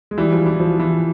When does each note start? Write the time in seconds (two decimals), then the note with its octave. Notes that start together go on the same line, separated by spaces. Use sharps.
0.11 G#3
0.18 E3 G3
0.32 F3
0.46 E3
0.60 F3
0.80 E3